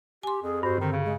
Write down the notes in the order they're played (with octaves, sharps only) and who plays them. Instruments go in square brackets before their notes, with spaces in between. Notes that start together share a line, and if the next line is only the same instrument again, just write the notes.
[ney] G4 [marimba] G#5 C6
[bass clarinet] F2 [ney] G#4
[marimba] G2 [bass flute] F#4 [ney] C5
[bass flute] D3 [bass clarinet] D#3 [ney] C4
[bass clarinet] C#3
[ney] G#3